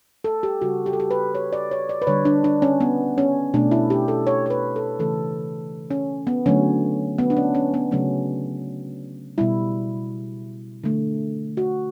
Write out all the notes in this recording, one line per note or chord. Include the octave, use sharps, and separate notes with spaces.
A4
G4
C#3 G3 F#4
G4
A4
G4
B4
C#5
D5
C#5
D5
B4
D3 G3 C#5
D4
D4
C#4
B3
C#4
B2 A3 D4
E4
G4
A4
C#5
C#5
B4
A4
C#3 E3 A3 A4
C#4
B3
D3 F#3 A3 C#4
B3
D4
C#4
C#4
B3
C#3 F#3 A3 C#4
B2 G3 E4
D3 A3
F#4